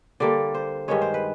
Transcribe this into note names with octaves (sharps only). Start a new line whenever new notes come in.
D3 G3 A#3 D5
C5
G2 D#3 G#3 C#5
C5
B4